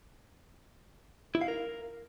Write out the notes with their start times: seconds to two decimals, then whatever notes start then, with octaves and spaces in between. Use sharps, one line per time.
1.35 E4
1.41 F5
1.48 A#4